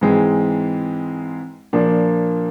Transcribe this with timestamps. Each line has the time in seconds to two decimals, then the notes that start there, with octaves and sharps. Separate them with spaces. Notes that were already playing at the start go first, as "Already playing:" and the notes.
0.01 G#2 E3 G#3 C4
1.73 A#2 F3 A#3 D4